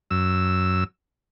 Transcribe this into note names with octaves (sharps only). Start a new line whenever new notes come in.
F#2 E6